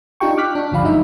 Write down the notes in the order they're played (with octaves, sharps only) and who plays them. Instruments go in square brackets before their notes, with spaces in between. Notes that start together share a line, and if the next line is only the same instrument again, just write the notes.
[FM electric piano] D4 D#4 F4 G4 G5 C#6
D6 F6 F#6 B6
D4
G1 D2 F3 D4 F5 B5
F#3 G#3 D#4 E5